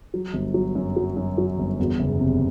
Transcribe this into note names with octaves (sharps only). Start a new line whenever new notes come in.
F#3
G1
F#3
F#2
F#3
F#2
F#3
G1
E2
F#1
C3